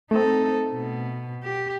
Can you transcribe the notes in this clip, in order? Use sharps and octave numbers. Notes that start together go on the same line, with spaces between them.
A3 C4 D#4 A4
B2
G4